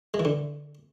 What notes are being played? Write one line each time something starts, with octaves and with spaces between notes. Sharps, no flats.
G#3
E3
D3